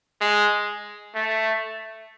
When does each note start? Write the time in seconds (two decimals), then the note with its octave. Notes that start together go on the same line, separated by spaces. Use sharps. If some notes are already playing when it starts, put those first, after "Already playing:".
0.21 G#3
1.15 A3